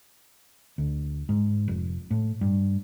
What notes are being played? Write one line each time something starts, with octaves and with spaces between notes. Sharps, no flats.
D2
G#2
F1
A2
G2